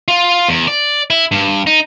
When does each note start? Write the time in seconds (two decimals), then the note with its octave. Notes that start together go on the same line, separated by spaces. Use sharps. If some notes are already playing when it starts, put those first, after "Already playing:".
0.08 F4
0.49 E2
0.68 D5
1.10 E4
1.32 G2
1.67 D#4